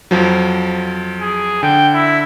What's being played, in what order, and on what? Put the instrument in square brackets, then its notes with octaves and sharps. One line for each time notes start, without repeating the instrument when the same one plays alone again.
[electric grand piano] F2 F3 F#3
[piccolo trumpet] G#4
[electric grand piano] D3 [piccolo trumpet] G5
[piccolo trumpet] E4